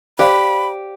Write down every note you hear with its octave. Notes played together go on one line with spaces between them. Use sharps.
G4 C5 D5 F5 B5